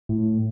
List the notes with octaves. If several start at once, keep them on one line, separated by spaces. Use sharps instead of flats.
A2